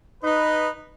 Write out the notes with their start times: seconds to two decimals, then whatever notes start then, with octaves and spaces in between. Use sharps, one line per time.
0.24 D#4 B4